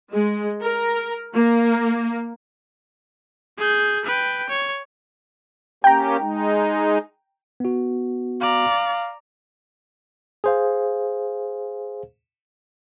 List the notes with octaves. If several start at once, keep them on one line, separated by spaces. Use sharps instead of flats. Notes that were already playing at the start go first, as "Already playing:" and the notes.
G#3
A#4
A#3
G#4 G6
B4 G5
C#5
A#3 C#4 G4 G5 A#5
G#3 D#4
B3 F#4
D5 F5 A#5
G#4 C5 F5